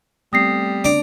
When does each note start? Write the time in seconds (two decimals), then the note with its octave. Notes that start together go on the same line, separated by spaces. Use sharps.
0.33 G3 A3 B3 C4 D#6 A#6 C7
0.84 C#3 D4 D5 A#5